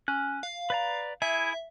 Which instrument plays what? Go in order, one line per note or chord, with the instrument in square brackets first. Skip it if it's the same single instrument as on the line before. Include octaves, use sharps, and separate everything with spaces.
[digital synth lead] C#4 [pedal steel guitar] F#6
[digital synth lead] F5
[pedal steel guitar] B4 D5 A#5
[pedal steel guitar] E4 G#4 G#5 [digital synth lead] E5